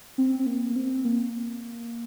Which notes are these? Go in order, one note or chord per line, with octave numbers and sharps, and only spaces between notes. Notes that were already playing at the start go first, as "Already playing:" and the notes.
C4
C4
A#3
A#3
C4
A#3